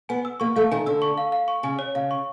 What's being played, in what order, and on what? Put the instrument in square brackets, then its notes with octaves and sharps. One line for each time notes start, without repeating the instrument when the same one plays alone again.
[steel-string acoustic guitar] B3 [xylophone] G#5
[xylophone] E6
[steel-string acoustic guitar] A#3 [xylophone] C#6
[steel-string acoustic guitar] A3 [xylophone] F5
[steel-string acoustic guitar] D#3 [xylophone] G#5
[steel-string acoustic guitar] D3 [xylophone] E6
[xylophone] C#6
F5
F5
C#6
[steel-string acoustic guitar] C#3 [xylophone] G#5
[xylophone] C#5
[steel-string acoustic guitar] C#3 [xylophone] F5
[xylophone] C#6